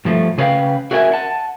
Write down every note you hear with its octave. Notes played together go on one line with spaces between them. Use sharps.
G2 F3 A3
C#3 G#4 B4 D5 F5 G5
F#4 G#4 A#4 E5 G5 G#5
D4 F#5 A5